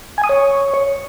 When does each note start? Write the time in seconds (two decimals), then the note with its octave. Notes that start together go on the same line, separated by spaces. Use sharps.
0.18 G#5
0.24 D#6
0.29 C#5